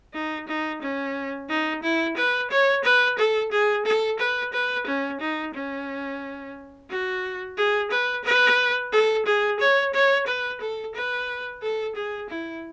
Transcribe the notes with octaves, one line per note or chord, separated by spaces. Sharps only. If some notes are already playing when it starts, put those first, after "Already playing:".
D#4
D#4
C#4
D#4
E4
B4
C#5
B4
A4
G#4
A4
B4
B4
C#4
D#4
C#4
F#4
G#4
B4
B4
A4
G#4
C#5
C#5
B4
A4
B4
A4
G#4
E4